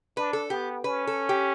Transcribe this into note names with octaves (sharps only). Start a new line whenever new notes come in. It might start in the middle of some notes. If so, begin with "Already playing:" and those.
D4 B4
A4
B3 G4
C#4 B4
A4
G4